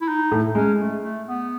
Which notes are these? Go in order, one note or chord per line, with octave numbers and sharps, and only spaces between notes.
E4
D#4
A2 A3
G#3 C#4
A3
A3
B3